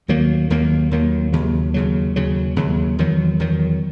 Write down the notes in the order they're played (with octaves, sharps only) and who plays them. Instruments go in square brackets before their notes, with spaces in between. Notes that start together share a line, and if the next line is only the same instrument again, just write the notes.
[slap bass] D#2 D#3 F#3 A#3
D#2 D#3 F#3 A#3
D#2 D#3 F#3 A#3
D#2 C#3 F#3
D#2 C#3 F#3
D#2 C#3 F#3
D#2 C#3 F#3
E2 D#3 F#3
E2 D#3 F#3